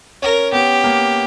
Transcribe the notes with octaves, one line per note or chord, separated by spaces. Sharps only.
C#4 A#4
B3 G4
A#3